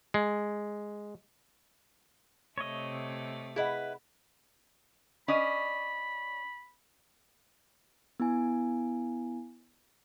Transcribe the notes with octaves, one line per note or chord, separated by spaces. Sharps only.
G#3
C3 A3 C#5 D#5
E4 G#4 B4 D#5 F#5 B5
C#4 D5 D#5 B5
B3 E4 G#5